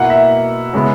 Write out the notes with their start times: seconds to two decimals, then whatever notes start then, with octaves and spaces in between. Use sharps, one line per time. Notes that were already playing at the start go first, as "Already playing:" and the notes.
Already playing: B2 A#3 E4 F#5
0.10 E5
0.73 C#3 G#3 B3 E4